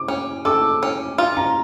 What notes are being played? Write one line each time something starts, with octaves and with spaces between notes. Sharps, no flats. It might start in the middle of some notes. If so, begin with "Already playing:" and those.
Already playing: D6
C#4
A4 D6
C#4
F4
A#5